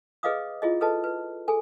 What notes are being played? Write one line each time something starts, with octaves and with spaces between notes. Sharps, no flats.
G#4 B4 D#5 F5 D6 D#6
E4 F4 G#4 D#5
G#4 A4 B4 D#5 A5
B4
G#4 A4 G#5